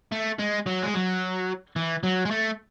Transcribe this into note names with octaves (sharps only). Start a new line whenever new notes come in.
A3
G#3
F#3
G#3
F#3
E3
F#3
G#3
A3